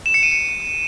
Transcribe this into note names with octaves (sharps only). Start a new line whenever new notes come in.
E7
C#7
D#7
C#7